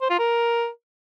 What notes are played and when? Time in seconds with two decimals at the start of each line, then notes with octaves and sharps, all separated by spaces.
0.01 C5
0.10 F4
0.18 A#4